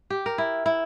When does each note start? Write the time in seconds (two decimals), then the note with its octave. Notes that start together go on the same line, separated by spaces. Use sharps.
0.10 G4
0.26 A#4
0.38 E4
0.66 E4